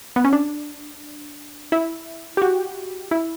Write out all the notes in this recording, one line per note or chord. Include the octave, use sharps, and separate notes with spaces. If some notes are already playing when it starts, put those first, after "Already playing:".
B3
C#4
D4
E4
G4
F#4
E4